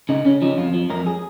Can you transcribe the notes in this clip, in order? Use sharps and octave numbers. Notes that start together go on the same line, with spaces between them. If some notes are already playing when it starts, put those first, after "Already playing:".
C#3 D#4
C#3 C#4
F3 D#4
F2 F4
F3
F2 A#4
G#4